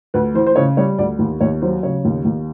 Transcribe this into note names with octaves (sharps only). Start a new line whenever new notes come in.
D2 B4
E3 C5
C5
C#3 C#5
G3 C#5
D2 D5
D#2
D#2 C#5
F#3 C5
C#3 C#5
D#2
D#2